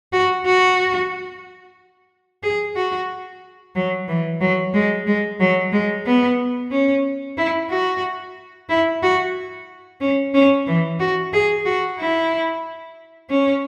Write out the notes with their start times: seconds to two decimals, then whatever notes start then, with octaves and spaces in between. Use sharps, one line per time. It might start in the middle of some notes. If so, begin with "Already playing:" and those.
0.13 F#4
0.46 F#4
2.43 G#4
2.76 F#4
3.75 F#3
4.08 E3
4.41 F#3
4.74 G#3
5.07 G#3
5.40 F#3
5.73 G#3
6.06 B3
6.71 C#4
7.38 E4
7.70 F#4
8.69 E4
9.03 F#4
10.01 C#4
10.34 C#4
10.67 E3
11.00 F#4
11.33 G#4
11.65 F#4
11.99 E4
13.30 C#4